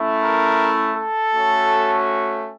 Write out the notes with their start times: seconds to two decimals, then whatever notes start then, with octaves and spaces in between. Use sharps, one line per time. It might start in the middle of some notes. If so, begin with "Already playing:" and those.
Already playing: A3 C#4 E4
0.20 A#4
0.95 A4
1.31 A3 C#4 F#4